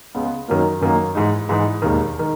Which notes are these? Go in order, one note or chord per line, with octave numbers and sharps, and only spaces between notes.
C#2 C#3 G#3 B3
F#2 D#3 F#3 A#3
F#2 D#3 F#3 A#3
G#2 E3 G#3 D#4
G#2 E3 G#3 D#4
E1 D#2 D#3
D#3